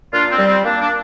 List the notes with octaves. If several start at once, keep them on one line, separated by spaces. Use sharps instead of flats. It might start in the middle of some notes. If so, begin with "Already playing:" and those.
A#2 D4 F4
C4
G3
C4
A#2 A#3 D4
D4